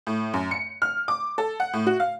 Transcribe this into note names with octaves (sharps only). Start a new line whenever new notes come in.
A2
F#2
C#7
F6
D6
A4
F#5
A2
F#4
F5